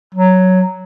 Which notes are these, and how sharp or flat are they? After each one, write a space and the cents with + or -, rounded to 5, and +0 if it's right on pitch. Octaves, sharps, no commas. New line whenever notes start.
F#3 +5